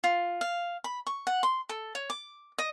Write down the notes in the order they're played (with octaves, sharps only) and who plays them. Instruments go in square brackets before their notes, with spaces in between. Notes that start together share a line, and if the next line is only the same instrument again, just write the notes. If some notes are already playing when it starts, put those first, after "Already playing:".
[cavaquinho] F4
F5
B5
C#6
F#5
C6
A4
C#5
D6
D#5